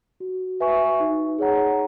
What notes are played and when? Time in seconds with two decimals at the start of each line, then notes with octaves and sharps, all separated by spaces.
0.20 F#4
0.60 B4 E5 G#5 C#6
1.00 D#4
1.39 G#4 C#5 F#5 A#5